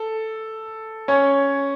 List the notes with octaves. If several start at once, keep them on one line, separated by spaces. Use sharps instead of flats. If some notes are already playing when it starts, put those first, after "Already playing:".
Already playing: A4
C#4 C#5